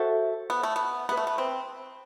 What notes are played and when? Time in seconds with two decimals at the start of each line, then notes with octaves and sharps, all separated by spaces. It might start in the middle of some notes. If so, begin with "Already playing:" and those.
Already playing: F#4 A4 C5 E5
0.50 B3
0.63 A3
0.76 B3
1.09 B3 B4 E5 B5
1.17 A3
1.27 B3
1.38 C4